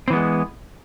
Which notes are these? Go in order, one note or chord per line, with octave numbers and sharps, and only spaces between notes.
E3 G#3 B3 C4